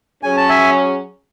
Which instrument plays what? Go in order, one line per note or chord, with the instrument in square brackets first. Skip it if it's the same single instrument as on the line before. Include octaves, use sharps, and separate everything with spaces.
[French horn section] F#3 C#4 G#4 [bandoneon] G#5
[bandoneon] A5
E5 G#5